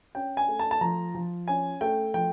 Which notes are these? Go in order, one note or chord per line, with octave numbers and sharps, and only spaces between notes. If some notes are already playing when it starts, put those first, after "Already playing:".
C#4 G5
G#5
A3
A5
A5
F3 A#5
F3
C#4 G#5
A3 G5
F3 G5